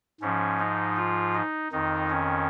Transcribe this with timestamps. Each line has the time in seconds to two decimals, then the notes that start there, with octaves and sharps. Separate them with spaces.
0.21 G#2 F3 C#4
0.59 D#4
0.97 F4
1.34 D#4
1.72 F2 D#3 D#4
2.10 C#4